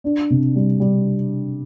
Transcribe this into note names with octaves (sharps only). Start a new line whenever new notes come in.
D4
C3
G3
G3